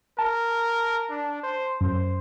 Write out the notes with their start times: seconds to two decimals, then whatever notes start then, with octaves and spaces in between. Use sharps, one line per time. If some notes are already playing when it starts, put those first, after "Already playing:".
0.19 A#4 A5
1.10 D4
1.43 C5
1.81 F#2 C5